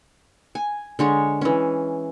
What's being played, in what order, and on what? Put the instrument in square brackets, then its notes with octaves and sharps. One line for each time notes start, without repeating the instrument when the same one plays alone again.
[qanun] G#5
D3 G#3 C#5
E3 C#4